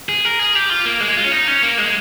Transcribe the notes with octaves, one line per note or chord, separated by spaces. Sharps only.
G#4
A#4
G#4
G4
F4
A#3
G#3
F4
C#4
D#4
C#4
A#3
G#3